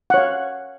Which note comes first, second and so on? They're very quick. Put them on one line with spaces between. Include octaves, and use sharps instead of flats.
F#5 C#5 F5